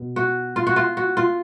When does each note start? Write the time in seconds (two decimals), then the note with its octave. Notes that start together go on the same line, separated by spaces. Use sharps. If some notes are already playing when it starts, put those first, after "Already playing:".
Already playing: B2
0.16 F#4
0.56 F4
0.67 F#4
0.76 F4
0.97 F#4
1.17 F4